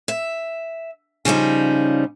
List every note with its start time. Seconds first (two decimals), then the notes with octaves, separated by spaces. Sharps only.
0.08 E5
1.25 C#3 F3 G3 D#4